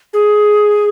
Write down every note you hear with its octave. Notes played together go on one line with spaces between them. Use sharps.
G#4